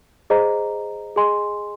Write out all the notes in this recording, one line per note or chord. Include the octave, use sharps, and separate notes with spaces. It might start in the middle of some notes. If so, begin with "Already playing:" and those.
G#4 C5 D#5 A#5
G#4 D#5 G#5 C6